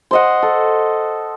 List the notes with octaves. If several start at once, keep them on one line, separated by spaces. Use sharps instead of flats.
C5 D#5 F#5
A4